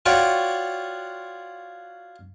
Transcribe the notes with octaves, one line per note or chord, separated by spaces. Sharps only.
F4 F#4 C#5 D5 G5